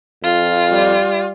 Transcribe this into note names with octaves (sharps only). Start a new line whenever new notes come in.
F2 F4
G3